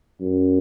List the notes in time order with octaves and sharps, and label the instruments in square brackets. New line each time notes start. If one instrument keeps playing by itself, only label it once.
[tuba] F#2